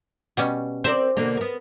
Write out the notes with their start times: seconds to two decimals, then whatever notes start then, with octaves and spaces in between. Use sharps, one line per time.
0.37 B2 G3 C#4
0.84 C4 A#4 C5 D5 E5
1.17 B2 D3 A#3
1.37 B3 A#4